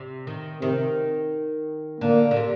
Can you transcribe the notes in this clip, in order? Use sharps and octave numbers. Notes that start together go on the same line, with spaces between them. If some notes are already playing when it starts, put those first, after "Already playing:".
Already playing: C3
D#3
C3 D#3
D3 A#3
D3
C3